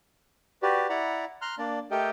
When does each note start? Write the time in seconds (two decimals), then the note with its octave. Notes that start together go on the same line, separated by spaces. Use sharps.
0.63 F#4 G4 B4 D5
0.90 E4 D5 F#5 A#5 B5
1.42 A#5 C6 F6 F#6
1.58 A#3 D4 D5
1.91 A3 G4 A4 A#4 D#5 G5